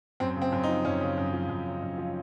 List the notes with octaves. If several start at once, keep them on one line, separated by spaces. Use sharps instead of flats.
F#2 C4
C#3
C4
F#2
D#4
F3
F#2 C#4
C#3
F#2
F3
F#2
C#3
F#2
F3